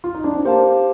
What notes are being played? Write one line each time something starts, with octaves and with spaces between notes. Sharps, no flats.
F4
D#4
D4
C4
A#3 G4 C5 F5 A5